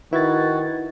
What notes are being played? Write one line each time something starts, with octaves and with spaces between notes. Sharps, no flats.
D#3 E4 F#4 B4 G#6 A6